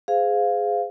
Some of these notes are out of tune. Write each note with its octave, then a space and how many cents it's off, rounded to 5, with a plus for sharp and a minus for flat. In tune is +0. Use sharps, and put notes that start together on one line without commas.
G#4 +0 C5 -30 F5 +0